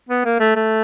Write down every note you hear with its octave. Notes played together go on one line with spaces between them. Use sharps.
B3
A#3
A3
A3